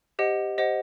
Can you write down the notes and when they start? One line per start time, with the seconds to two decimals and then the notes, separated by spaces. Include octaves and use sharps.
0.19 G4 C5 D#5 F#5
0.58 G4 C5 D#5 F#5